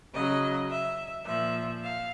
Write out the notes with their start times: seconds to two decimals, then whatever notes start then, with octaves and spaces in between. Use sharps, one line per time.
0.14 C#3 F#3 D#5
0.70 E5
1.25 A#2 F3 E5
1.82 F5